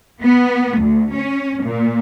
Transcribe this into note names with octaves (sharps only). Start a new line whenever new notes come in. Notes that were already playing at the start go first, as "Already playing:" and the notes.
B3
D2
C#4
A#2